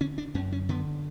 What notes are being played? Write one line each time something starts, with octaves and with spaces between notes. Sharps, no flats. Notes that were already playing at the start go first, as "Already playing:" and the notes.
D3 C#4
D4
F#2 C#4
C#4
D3 B3